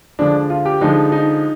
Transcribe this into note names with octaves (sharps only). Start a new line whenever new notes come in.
D3 F3 G#3 D4
F4
G4
D3 F3 G#3 D#4
D#4